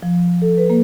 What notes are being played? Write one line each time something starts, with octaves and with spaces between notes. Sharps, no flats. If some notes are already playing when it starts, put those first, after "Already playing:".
F3
A4
B4
A#3